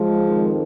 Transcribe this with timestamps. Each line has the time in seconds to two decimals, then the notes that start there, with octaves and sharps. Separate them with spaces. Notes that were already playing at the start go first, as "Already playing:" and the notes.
Already playing: F3 G#3
0.24 F2 D#3